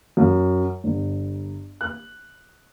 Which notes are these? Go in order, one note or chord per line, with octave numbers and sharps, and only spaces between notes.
F#2
G1
F#6